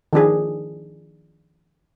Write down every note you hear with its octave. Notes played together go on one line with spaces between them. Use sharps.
D#3 F3 D4 G#4